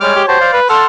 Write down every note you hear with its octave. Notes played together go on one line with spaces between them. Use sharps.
G3 G#3 C#5 D6 F6
G4
F#4 G4 C5 A5
D5 F5
B4
A4 F#5 A5 C6 F6